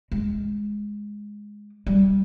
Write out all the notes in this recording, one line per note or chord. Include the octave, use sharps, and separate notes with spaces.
G#3
G3